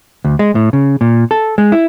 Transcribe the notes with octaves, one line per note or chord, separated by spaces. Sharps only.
D2
G#3
A2
C#3
A#2
A4
G#3
E4